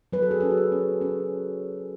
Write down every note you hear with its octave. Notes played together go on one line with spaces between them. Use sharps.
F#3 B4
A4
G#4
C#4 A4
F#4
G#4
C#4
C#4